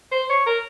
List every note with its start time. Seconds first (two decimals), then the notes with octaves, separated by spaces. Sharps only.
0.12 C5
0.30 C#5
0.46 A#4